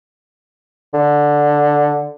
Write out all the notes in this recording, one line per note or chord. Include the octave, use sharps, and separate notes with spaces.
D3